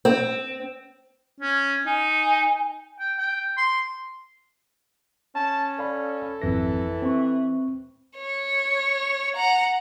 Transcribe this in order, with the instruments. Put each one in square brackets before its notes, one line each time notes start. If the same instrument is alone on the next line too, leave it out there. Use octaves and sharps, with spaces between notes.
[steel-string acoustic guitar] C4
[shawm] C#4
[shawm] D#4 [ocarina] G#5
[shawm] G5
G5
C6
[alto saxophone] C#4 [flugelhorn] A5
[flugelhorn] A4 [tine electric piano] D5 F5 B5
[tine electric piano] G#1 F2 A#6 [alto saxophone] E3
[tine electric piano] C4 C#6
[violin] C#5
F#5 A#5